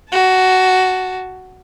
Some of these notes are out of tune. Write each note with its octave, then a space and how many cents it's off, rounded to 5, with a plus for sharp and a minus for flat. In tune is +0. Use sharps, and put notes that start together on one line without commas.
F#4 +10 A5 +5